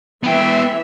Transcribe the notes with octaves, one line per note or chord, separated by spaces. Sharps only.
E3 B3 E5 G5